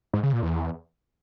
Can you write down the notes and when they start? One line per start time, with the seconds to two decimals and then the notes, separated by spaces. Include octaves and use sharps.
0.13 G#2
0.23 C#3
0.33 A#2
0.43 E2